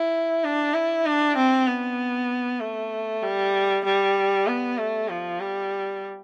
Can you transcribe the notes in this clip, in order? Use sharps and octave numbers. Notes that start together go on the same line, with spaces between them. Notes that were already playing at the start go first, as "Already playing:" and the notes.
Already playing: E4
D4
E4
D4
C4
B3
A3
G3
G3
B3
A3
F3
G3